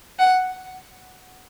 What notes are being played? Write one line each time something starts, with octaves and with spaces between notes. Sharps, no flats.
F#5